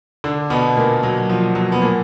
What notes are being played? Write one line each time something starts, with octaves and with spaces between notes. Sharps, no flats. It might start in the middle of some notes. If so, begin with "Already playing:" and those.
D3 D4
B2 B3
A#2 A#3
F#3
F3
F#3
B3
A#2 A#3